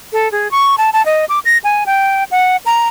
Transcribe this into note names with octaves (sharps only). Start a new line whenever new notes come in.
A4
G#4
C#6
A5
A5
D#5
D6
A#6
G#5
G5
F#5
A#5